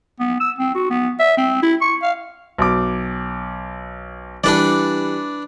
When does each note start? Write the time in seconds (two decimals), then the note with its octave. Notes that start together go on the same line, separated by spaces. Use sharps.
0.20 B3
0.40 E6
0.59 C4
0.75 F#4
0.90 B3
1.20 E5
1.37 C4
1.62 E4
1.81 C#6
2.03 F5
2.58 B1 D6
4.44 E3 G3 D4 B4 D5